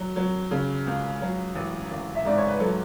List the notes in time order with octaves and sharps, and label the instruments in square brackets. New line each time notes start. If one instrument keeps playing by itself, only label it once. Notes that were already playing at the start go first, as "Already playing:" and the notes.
Already playing: [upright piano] F#3
F#3
C#3
C#2
F#3
A1
A1
E5
G#2 D5
C#5
B4
F#3 A4